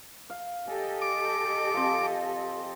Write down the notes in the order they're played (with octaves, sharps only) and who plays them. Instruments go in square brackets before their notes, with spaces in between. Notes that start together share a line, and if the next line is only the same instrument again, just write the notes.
[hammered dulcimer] F5
[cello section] G4 A4 D#5 [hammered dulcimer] G#5
[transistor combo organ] D6
[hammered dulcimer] F3 C4